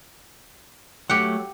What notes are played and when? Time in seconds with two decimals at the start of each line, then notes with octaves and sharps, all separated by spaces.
1.10 F#3 A3 G4 F#5